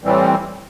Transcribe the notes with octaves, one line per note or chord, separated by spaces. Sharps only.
A2 E3 G3 C4